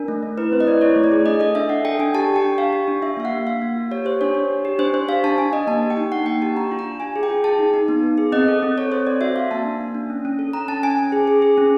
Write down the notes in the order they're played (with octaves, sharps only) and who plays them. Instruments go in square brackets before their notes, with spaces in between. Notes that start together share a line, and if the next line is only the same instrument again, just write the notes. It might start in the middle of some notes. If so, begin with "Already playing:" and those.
Already playing: [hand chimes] D4 A#4
A3
A3
E4 B4
C4 C5
D#5
E4 D5
E4 C#5
A3
D5
G#4
D4 D#5
A4 D#5
D4 E5
D4 F#5
A4 G5
D4 G#5
G4 A5
G4
G5
D4
G4 F5
G4
D4
F4 E5
A#3 F5
F#5
A#3
A#3 F5
A#3
F4
G4 C#5
G4 C5
D4 C#5
D4
G4
G4
D4 C5
D4 C5
G4 F5
D4 A5
D4 G#5
D4 D#5
A#3 A5
G4
G5
D#4
A#3 F#5
A#3 G5
G4 A5
D4 A#5
F4
A#5
D4
F4 G#5
G#4
G5
F4
G#4 A5
D#4
D#4
B3
B3
G#4
C4 D#5
A4
C4
A4 C#5
C4 C5
C4 D5
F#4 E5
F#4 F5
A#3 A5
D4
A#3
D4
C#4
C#4
A4
C#4 A#5
C#4 A5
C#4 G#5
C#4
G#4
G#4
G#4
C#4